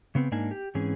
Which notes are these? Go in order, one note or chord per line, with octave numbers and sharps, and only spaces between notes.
C#3 B3 C4
G#2 A#3 D4 D#4 G#5
G4
G#2 E3 C4 C#4 G#4